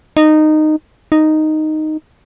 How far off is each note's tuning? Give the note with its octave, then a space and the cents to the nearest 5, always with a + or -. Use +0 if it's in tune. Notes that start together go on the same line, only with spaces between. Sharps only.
D#4 -15
D#4 -5